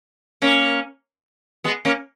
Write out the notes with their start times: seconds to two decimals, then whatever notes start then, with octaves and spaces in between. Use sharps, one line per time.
0.42 A#3 C#4
1.64 G#3 B3
1.85 A#3 C#4